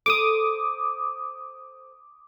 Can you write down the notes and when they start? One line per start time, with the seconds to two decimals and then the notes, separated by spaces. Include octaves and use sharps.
0.06 A4 C5 A#5 D6 D#6